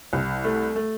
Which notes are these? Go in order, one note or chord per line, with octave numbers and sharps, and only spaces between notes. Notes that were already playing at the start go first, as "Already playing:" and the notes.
C2
A3
A3